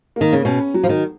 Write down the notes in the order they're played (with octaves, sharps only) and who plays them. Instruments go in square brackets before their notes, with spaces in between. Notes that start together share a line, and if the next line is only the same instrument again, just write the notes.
[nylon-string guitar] D#3 [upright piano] A#3
[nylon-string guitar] C#3
[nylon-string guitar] B2 [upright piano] C#4
[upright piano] F#3
[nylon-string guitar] F3
D#3